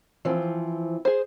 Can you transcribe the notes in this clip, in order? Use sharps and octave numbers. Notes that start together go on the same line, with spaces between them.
E3 F3 C4
G#4 C5